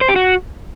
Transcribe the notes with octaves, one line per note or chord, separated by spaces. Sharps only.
C5
G4
F#4